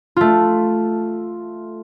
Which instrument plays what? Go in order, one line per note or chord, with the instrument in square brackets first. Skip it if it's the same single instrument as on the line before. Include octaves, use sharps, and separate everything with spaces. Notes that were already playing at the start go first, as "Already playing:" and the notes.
[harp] A3 F4